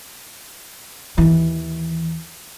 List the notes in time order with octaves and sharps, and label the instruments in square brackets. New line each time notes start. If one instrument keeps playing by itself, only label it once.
[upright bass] D#2 E3